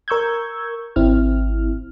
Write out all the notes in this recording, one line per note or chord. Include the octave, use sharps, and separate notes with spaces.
A#4 C#6 E6 G6 G#6
G#1 C4 E4 F6